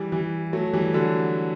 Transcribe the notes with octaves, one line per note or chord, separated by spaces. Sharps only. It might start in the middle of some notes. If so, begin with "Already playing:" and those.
Already playing: E3 G3
E3 G3
F#3 A3
E3 G3
D3 F#3